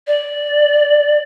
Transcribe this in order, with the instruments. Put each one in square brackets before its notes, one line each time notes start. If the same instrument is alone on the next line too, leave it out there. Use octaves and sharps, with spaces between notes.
[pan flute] D5